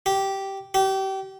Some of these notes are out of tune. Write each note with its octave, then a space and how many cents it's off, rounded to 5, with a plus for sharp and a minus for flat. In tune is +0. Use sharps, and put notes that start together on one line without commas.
G4 -10
G4 -30